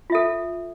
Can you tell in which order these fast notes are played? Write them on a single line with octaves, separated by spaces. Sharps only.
F4 E5 A4